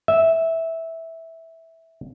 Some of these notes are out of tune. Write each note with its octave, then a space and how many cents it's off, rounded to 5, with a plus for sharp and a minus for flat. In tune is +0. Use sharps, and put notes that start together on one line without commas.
E5 -10